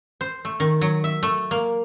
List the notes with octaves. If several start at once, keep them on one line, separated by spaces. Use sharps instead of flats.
C5
A3
D#3
F#3
E5
A3
A#3